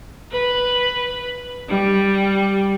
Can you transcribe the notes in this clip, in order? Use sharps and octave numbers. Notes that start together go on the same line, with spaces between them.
B4
G3